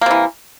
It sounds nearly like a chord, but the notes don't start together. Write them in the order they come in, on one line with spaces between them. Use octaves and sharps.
A#3 C3 E3